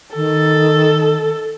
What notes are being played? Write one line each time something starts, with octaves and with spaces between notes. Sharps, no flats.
D#3 A4